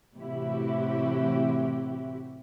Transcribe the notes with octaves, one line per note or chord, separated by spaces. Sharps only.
A2 C3 E3 E4 F#4 G4